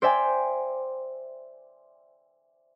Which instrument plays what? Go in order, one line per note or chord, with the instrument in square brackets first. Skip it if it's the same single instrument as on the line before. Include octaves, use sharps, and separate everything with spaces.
[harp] C5 D5 E5 G5 G#5